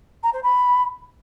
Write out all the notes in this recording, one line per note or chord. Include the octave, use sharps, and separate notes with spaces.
A#5
C5
B5